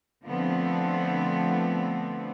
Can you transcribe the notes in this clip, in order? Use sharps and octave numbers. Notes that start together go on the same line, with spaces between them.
D3 F3 A3 B3 C4